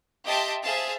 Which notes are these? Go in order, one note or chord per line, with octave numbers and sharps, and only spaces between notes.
G4 D#5 E5 A5 C6 D6
G#4 C5 E5 F5 A5